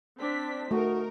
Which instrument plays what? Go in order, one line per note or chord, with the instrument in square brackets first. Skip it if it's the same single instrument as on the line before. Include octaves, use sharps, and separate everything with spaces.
[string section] C4 D4 B6
[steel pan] A3 [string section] D#4 A#4 [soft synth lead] F#4